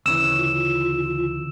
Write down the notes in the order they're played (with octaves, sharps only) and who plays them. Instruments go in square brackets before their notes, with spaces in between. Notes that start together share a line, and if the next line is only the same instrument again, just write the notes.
[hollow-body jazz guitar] D2 C#3 E3 [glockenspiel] E6 E7
[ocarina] F4